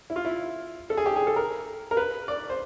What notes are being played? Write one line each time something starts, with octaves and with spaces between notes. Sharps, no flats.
E4
F4
E4
A4
G#4
G4
G#4
A4
A#4
A#4
B4
D5
C5